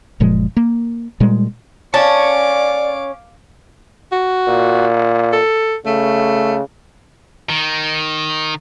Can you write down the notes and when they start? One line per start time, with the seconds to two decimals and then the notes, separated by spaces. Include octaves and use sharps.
0.20 F#1 A#2 F3 G#3
0.57 A#3
1.20 A#2 G3 G#3
1.94 C#4 D5 F5 A5 D6
4.12 F#4
4.48 A#2
5.32 A4
5.86 C#3 A3
7.50 D#3